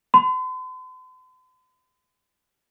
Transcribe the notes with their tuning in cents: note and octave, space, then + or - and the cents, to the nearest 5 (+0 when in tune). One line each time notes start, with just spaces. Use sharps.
C6 -45